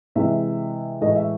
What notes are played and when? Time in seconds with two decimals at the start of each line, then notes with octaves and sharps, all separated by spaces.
0.15 C3 E3 G#3 E5
1.01 A2 E3 G#3 D#5
1.16 E5